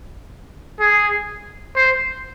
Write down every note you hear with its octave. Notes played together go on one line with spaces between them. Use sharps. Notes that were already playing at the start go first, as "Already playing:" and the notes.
G#4
C5